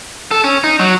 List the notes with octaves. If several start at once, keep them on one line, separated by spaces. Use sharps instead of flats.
A4
C#4
D#4
F#3